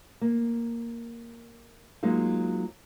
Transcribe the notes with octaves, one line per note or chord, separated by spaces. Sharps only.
A#3
F#3 G#3 A#3 D#4 F4